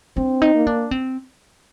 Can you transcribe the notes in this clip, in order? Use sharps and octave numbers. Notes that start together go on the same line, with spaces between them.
C4 D4
D#4
A#3
D4
C4